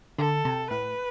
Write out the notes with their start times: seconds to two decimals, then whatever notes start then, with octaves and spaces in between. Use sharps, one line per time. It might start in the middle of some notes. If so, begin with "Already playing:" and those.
0.18 D3 A4
0.45 C3
0.70 A2 B4